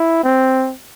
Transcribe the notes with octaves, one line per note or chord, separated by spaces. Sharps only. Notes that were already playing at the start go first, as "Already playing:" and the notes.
Already playing: E4
C4